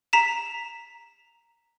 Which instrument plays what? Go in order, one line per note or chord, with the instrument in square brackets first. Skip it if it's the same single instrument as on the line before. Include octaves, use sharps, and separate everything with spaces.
[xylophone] A#5 B6 E7